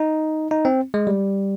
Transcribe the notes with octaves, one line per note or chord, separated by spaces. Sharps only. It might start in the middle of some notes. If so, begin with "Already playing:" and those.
Already playing: D#4
D#4
C4
G#3
G3